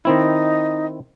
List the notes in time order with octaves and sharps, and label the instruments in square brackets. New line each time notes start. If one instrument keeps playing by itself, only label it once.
[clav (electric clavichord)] D#3 C4 E4 [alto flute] D#4